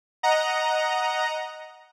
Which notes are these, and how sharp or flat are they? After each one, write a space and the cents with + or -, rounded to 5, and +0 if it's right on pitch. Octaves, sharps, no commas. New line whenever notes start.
D#5 +0 F#5 +0 A#5 +5